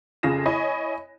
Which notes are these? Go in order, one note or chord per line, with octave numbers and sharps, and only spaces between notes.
F1 C#3 F4 G#4 A#6 E7
E4 C#5 D#5 G#5 B5